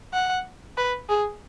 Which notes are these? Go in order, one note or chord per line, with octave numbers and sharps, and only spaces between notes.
F#5
B4
G#4